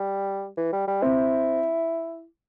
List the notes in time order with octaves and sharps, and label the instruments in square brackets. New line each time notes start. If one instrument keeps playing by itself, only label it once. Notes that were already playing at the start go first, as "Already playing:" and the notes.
Already playing: [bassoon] G3
E3
G3
G3
[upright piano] C4 [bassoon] E4